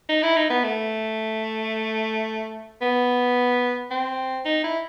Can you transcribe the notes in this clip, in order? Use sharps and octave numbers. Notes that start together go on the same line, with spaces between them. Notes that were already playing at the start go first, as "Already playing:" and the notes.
D#4
E4
D#4
B3
A3
B3
C4
D#4
E4